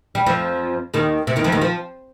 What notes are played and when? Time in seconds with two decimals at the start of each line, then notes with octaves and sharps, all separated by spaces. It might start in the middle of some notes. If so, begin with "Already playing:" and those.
0.15 G3
0.27 F2 F3
0.94 D#2 D#3
1.27 C3
1.36 D#2 D#3
1.44 F2 F3
1.52 D#2 D#3
1.61 F3